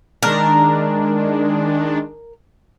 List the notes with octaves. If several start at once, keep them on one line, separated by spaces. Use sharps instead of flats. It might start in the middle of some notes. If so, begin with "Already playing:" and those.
D#3 G#3 D4 A#4